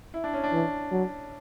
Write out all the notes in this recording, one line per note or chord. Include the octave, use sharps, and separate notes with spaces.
E4
D4
C#4
D4
E3
F#3